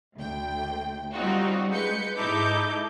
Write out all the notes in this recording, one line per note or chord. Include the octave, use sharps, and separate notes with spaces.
D2 G5
G3 C4 C#4 D#4 F4 F#4
G#3 B4 G6 C#7
G#2 D#4 E4 A4 D6 G6